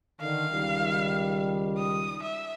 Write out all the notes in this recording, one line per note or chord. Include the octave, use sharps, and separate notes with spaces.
D3 D#3 F5
C#2 D#3 G3
D#6
E5